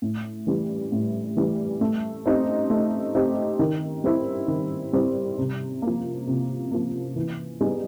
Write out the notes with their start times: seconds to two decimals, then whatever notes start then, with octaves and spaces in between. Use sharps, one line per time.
0.02 A2
0.47 E3 G3
0.92 A2
1.37 E3 G3
1.81 A3
2.26 C4 D#4 G4
2.70 A3
3.15 C4 D#4 G4
3.59 D#3
4.04 G3 C4 E4
4.48 D#3
4.93 G3 C4 E4
5.38 C3
5.82 F3 A#3
6.27 C3
6.71 F3 A#3
7.16 E3
7.61 G3 B3 D#4 G#4